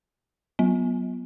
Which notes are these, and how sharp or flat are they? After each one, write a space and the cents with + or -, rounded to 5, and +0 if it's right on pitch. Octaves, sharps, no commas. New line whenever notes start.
F#3 +15 B3 -15